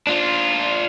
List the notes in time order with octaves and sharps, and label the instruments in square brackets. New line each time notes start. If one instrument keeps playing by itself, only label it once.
[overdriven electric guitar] D4 F4